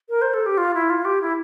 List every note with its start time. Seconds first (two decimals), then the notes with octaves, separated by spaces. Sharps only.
0.09 A#4
0.22 C5
0.34 A4
0.46 G4
0.58 F4
0.74 E4
0.90 F4
1.05 G4
1.22 E4